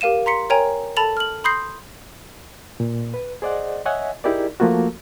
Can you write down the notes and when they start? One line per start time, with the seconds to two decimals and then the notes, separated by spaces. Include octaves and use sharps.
0.01 G4 A#4 F5 D#7 E7
0.26 A#5 C6 B6 C#7
0.50 A#4 C#5 G5 G#5 A#5
0.97 A4 A5 B5 A6 F7 F#7
1.17 F6 F#7
1.44 B5 C6 D#6 G6 A#6 C7
2.80 A#2
3.14 B4
3.42 G#4 C5 D5 D#5 F#5
3.86 C#5 D#5 E5 F#5 G#5
4.24 D#4 E4 G4 G#4 A#4 D5
4.60 F3 A3 A#3 F4 F#4